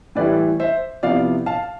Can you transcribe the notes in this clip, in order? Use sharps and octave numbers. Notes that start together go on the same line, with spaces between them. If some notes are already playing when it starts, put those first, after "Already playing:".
A2 E3 G3 B4 D5
C5 E5
C3 F3 B3 E4 D5 F5
F5 A5